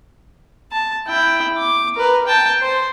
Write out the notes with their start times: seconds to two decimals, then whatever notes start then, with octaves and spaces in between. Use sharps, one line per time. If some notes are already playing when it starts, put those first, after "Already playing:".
0.72 A5
1.08 E4 G5
1.58 D6
1.96 A#4 B4
2.27 G5 A5
2.61 C5